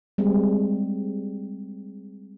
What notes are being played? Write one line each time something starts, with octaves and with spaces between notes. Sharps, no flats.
G3 G#3 C4